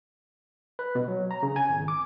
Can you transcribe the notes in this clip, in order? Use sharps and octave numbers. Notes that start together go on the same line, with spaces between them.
B4
B2
F#3
A#5
C#3
G#5
G#1
D6